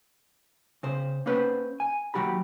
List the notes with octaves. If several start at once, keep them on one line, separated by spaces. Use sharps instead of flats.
C#3 C5
A#3 C#4 B4 C5
G#5
D#2 E3 F#3 F#4 G4 B5